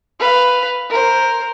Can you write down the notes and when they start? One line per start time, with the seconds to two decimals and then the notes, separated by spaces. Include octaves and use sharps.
0.20 B4 F5
0.90 A#4 C5